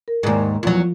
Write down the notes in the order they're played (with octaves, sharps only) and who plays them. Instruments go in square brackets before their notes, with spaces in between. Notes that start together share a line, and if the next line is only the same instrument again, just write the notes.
[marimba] A#4
[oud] D#2 G#2
[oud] E2 F#3 [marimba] F3 F4